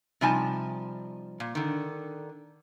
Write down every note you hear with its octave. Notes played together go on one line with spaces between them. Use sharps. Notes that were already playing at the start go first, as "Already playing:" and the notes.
C3 F3 G3 D#4 G#5 A5
A#2
D3 D#3